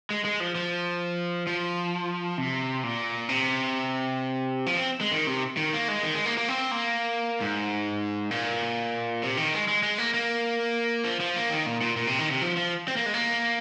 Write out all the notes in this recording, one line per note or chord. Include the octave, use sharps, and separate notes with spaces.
G#3
G#3
F3
F3
F3
C3
A#2
C3
F3
C4
G#3
D#3
C3
D#3
A#3
G#3
D#3
G#3
A#3
A#3
C4
A#3
G#2
A#2
C3
D#3
G#3
G#3
G#3
A#3
A#3
F3
F3
A#3
D#3
A#2
A#2
A#2
C3
D#3
C3
F3
F3
C4
A#3
G#3
A#3